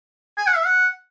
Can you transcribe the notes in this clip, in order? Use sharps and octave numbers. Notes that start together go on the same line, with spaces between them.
G#5
F#5
E5
F#5